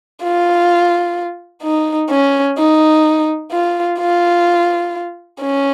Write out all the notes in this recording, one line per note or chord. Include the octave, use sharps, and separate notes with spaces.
F4
D#4
C#4
D#4
F4
F4
C#4